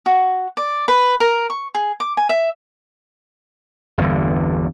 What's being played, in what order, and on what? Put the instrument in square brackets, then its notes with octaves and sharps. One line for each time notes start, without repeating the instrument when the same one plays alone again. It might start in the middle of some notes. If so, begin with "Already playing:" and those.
[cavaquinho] F#4
D5
B4
A#4
C#6
G#4
D6
G#5
E5
[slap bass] G1 E2 G2 D3